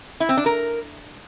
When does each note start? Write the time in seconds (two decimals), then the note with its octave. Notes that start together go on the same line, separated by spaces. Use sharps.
0.20 E4
0.29 C4
0.37 D4
0.46 A#4